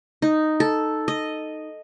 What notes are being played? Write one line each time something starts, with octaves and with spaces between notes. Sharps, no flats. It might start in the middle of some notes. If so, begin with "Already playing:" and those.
D#4
A4
D#5